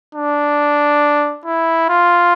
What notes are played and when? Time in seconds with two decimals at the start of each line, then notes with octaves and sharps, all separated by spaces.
0.15 D4
1.45 E4
1.89 F4